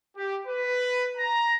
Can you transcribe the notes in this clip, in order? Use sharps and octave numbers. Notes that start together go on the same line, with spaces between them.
G4
B4
A#5